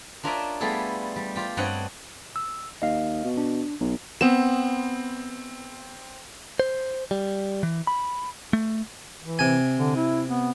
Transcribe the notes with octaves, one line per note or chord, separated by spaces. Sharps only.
D4 F4 A#4 C#5 D#5 E5
G3 A3 B3 F4 G#4 A4
G3
F4 G4
G2 C4 C#5 D#5 F#5
E6
D#2 D#5 F5
B2
D4
B1
B3 C4 E7
C5
G3
E3
B5
A3
E3
C3 G#5
D3
E4
B3